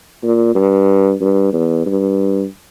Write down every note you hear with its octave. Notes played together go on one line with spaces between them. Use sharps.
A#2
G2
G2
E2
G2